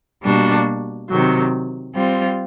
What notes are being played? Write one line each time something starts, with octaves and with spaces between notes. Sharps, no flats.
B2 G3 A#3 D4 F#4
C3 D#3 F#3
G3 C4 F4